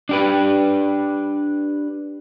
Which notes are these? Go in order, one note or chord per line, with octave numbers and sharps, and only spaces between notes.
D4 G4 B4